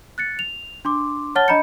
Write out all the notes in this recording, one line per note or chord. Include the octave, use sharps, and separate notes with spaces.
F#6 A6 C#7
F7
D4 C6 D6
C#5 F#5 A5 F6 A6 G7
D4 D#5 A#5 B5 G6 C#7